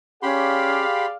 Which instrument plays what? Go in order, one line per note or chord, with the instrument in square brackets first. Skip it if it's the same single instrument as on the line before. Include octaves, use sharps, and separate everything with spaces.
[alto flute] C#4 [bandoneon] G4 B5 C6 [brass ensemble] G#4 D5 F5